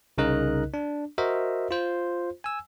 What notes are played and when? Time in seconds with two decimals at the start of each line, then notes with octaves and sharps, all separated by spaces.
0.18 C2 C#3 D#4 A#4 D#5 F#6
0.74 D4
1.18 F#4 A#4 C5 D#5 E5
1.71 F4 C5
2.44 G#5 E6